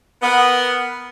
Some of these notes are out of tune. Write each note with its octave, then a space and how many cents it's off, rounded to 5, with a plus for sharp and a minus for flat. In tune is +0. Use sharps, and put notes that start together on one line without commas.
B3 +0 A#4 +0